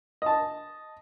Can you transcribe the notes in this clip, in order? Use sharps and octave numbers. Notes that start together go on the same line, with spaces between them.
D#5 A5